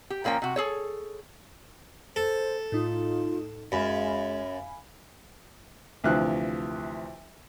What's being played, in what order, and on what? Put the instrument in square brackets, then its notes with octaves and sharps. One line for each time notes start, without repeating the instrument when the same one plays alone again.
[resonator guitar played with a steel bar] G4
A#2 F3 A#3 C#4 G5
C3 F#4
G#4 A4 C#5
[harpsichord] A4 [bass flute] C5
[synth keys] A2 D#4 [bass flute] F4
[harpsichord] F#2 [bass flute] G#3 [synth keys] F5 G#5 B5
[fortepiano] D2 C3 E3 F3 F#6